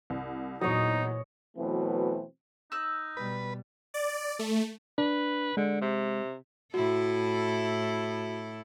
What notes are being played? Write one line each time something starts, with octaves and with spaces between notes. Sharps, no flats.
C2
E2 A#2 F#3 D#4 C#5 D#5
B2 E3 F#3 A3 C4
D#4 E6 F#6
B2 G3 B4
D5
A3
D4 B4
D3 G#3
C3
A2 E4 F#4 A4